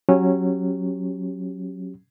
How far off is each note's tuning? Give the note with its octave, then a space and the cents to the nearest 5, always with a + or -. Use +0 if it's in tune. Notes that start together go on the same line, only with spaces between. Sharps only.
F#3 +0 C#4 -15 G4 +0